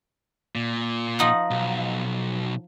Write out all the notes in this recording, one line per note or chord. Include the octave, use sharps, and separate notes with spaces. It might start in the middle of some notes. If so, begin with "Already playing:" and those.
A#2
F3 D#4 F#5
B1